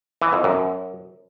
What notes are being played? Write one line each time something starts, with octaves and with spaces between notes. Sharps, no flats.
E3
F2
F#2